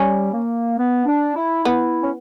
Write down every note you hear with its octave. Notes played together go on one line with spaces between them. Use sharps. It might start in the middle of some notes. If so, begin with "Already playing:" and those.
Already playing: G3 C#4
A#3
B3
D4
E4
B3 E4
C#4